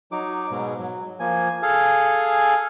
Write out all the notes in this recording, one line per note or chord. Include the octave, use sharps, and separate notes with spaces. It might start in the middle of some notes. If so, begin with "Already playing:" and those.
F#3 D#4 D6
G#2 B2
F#3
F3 A#3 G#5
G#4 A4 F5 G#5